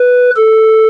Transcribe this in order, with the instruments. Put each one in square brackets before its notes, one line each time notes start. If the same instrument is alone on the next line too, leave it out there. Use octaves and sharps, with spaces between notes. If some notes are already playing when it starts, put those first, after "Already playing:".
Already playing: [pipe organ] B4
A4